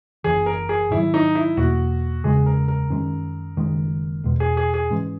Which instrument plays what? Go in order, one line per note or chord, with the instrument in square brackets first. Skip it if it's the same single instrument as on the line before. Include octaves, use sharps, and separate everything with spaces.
[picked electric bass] F#1 F#2 E3 [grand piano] G#4
[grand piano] A#4
G#4
[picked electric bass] G#2 D#3 F#3 [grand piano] E4
[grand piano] D#4
E4
[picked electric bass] E2 B2 A#3 [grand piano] F#4
[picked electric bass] F#1 E2 C#3 G#3 [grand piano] G#4
[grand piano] A#4
A#4
[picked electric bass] F#2 D#3 G#3 C#4
F#1 F#2 D#3 G#3
E1 E2 B2 G#3
[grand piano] G#4
G#4
G#4
[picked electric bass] G#2 E3 G#3 C#4